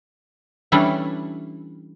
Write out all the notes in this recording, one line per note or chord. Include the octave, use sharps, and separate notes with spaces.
E3 G3 A3 C#4 D4 E4